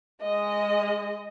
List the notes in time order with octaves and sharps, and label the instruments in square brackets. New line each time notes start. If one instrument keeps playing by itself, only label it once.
[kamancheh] G#3 D#5